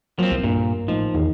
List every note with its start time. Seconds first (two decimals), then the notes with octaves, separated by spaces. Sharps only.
0.19 F3 F#3 A#3 C4
0.31 C2
0.43 G2 A#2
0.88 A1 F3 D#4
1.14 E2 D#3